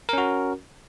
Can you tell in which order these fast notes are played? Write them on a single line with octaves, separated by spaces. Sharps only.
A#4 C#4 F#4